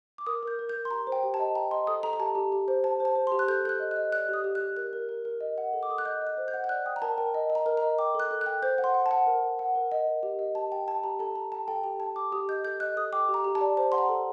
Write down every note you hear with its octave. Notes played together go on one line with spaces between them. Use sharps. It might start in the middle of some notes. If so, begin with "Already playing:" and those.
D6
A#4 D#6
A#4 G6
A#4
G6
A#4
C6
G4 A#5
C5
G5
G4
A5
D#5
G5 A#5
D#5 C6
A4 D#6
A4 A#5
A#5
G4 A5
G4
G4
C5
C5 A5
C5
A5
C5
G4 C6
F#6
A4 G6
A4 F#6 G6
D#5
F#6
D#5
D5 F#6
G4
D#6
G4
G4 F#6
A#4 F#6
A#4
A#4
A#4
D#5
F#5
A4
D6
A4 D#6
F#6
D#5 G6
D#5
F#6
C5
G6
F#5
G6
D5 F#6
G5 D#6
A#5
A#4 A5
A#4 G5
D#5
D#5
A#5
A#4
D#5 A#5
G5 D6
A4 F#6
A4
G5 F#6
C5 G6
F#5
C6
F#5
A5
F#5
A#4
A#4
F#5
A#4
D#5
A#4
G4
D#5
G4 A5
G4 G5
G5 A5
G4 A#5
A4 A5
A4 A#5
G5 A5
A4 G5
G4 G5
G5 A5
G4 D6
G4 D#6
D#5 G6
A4 G6
D#5 F#6
A4 D#6
G5 D6
G4
A#5
G4
A5
D5
C5 A5
F#5 C6
A#5
A4